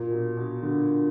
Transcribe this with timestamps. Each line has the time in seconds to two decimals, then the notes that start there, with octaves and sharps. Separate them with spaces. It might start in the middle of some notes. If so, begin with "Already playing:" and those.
Already playing: A#2
0.11 B2
0.37 B2
0.63 D3